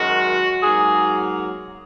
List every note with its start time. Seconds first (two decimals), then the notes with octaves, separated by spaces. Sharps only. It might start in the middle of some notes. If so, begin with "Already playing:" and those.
Already playing: F#2 D#3 G#3 F#4
0.63 G#2 F#3 A#3 G#4